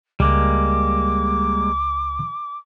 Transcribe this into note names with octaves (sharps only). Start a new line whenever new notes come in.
C#2 G3 G#3 A#3 D6